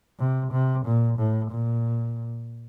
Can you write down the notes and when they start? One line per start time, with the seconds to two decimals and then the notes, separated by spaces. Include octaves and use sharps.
0.19 C3
0.52 C3
0.86 A#2
1.18 A2
1.51 A#2